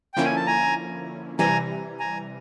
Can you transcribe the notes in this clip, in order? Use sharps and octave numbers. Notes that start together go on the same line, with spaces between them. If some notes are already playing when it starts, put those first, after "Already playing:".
D3 F3 A#3 C#4 E4 G5
G#5
A5
G#5 A#5
C3 E3 G3 G#5 A#5
G#5 A#5